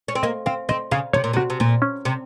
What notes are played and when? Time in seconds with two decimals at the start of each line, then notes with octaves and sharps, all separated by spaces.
0.08 C#4
0.15 C4
0.23 A#3 D#5
0.46 C4 F5
0.69 C4 D#5
0.91 C#3 F5
1.13 C3 C#5
1.24 A#2
1.33 C3
1.37 F#4
1.50 C3
1.60 A#2
1.82 C#4
2.05 C3